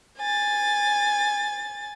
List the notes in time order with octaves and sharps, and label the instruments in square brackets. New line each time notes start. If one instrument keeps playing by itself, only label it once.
[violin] G#5 A6